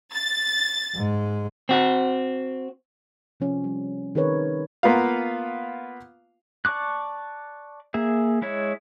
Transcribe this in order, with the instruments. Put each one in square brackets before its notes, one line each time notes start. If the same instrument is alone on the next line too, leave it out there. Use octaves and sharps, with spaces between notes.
[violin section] A6
[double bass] G#2 G#3
[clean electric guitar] C4 F#4
[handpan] C3 F3 C#4
G3
D#3 C4 G#4 A#4 B4 C#5
[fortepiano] A#3 B3 F4 F5
[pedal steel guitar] D5 A5 C#6 D6 F#6
A#3 G#4 E5
G#3 E4 C#5 E5